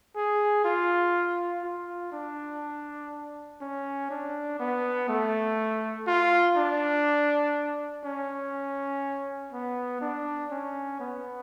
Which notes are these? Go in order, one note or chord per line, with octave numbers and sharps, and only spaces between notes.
G#4
F4
F4
D4
C#4
D4
B3
A3
F4
D4
C#4
B3
D4
C#4
B3